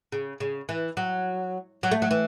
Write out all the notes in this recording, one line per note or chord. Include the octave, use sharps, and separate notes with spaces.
C#3
C#3
E3
F#3
F#3
A3
F#3
E3